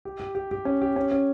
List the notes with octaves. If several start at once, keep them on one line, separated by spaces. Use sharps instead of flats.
G4
G4
G4
G4
C#4
G4
C#4
C#4